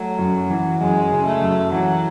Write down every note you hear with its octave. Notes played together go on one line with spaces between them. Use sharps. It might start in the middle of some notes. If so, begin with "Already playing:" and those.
Already playing: F#3 A3
F#2
E3
F#2 G#3
C#3
A3
F#2
E3 F#3